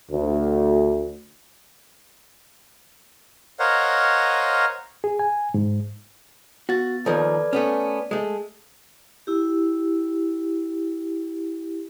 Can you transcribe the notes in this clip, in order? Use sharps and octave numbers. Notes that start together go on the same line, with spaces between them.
D2
A#4 C5 C#5 D#5 F5 F#5
G#4
G#5
G#2
B3 F#4 A6
D#2 F3 A4 B4 D5
A3 B3 C#4
G#3 A3
E4 G4